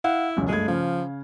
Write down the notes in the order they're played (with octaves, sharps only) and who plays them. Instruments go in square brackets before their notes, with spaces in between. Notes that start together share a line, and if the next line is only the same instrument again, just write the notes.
[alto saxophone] E4 [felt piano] F5 F#5
[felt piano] E1 C#2 F#2
[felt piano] G2 A3 G#6 [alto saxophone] G#3
[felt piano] C#3 F5 [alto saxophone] F3